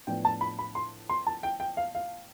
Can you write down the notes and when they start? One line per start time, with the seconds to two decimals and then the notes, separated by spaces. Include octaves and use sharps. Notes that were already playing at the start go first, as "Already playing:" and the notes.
0.07 A2 F3 B3 D4 G5
0.25 A5
0.41 B5
0.59 B5
0.75 C6
1.09 C6
1.27 A5
1.43 G5
1.60 G5
1.77 F5
1.95 F5